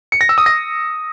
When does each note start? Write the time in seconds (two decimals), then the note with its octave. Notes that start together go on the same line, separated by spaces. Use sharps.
0.12 C#7
0.21 A#6
0.29 E6
0.38 D#6
0.46 A#6